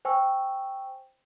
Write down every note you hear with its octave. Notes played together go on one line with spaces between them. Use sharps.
C5 G5 G#5 C#6 E6